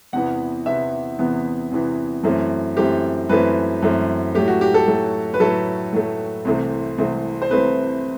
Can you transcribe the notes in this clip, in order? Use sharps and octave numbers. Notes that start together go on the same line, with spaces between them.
E2 C3 E3 B3 F#5
E2 C3 E3 B3 E5
E2 C3 E3 B3
E2 C3 E3 B3
F#2 E3 A3 C4
F#2 E3 A3 C4 G4
F#2 E3 A3 C4 B4
F#2 E3 A3 C4
A2 F#3 A3 G4
F#4
G4
A4
A2 F#3 A3
B4
A2 F#3 A3 A4
A2 F#3 A3
C2 C3 E3 A3 C4
C2 C3 E3 A3 C4
C5
C2 C3 E3 A3 C4 B4